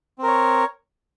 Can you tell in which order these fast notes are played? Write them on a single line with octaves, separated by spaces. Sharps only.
C4 A#4 C#5